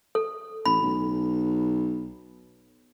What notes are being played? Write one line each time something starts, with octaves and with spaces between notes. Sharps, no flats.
A4
A1 B5
B1